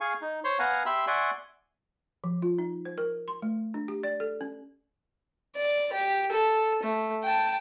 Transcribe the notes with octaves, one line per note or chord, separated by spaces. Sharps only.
G#4 F5 G#5 C#6
D#4
C5 C#5 C6
B3 F5 F#5 G#5 A#5
G4 E5 B5 C6 E6
D5 E5 F#5 G#5 C6 C#6
F3
F4
D#4
C5
A#4
C6
A3
D4
G4
D5
A4
C#4
D5
G4
A4
A3
G5 A5